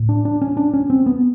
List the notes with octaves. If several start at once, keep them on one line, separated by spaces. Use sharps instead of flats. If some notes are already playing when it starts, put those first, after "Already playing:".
Already playing: A2
D4
D4
C#4
D4
C#4
C4
B3